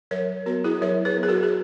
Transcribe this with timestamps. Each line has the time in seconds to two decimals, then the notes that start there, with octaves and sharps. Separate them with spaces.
0.11 F#3 A#4 C#5
0.46 B3 F#4 A#4
0.64 E4 G#4
0.82 F#3 A#4 C#5
1.05 G#4 B4
1.17 B3
1.23 G#4
1.29 F#4 A#4
1.43 G#4